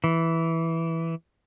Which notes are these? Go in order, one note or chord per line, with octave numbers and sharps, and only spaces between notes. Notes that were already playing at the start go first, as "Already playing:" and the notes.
E3